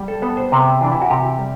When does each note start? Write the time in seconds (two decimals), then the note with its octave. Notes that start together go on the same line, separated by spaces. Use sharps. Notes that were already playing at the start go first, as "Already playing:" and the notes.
Already playing: G3
0.08 A4
0.22 B3 A4
0.37 C5
0.52 C3 B4
0.81 E3 D4
0.92 E4
1.02 F#4
1.10 C3 G4
1.39 G3